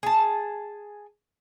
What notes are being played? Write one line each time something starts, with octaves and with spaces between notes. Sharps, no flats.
G#4 A5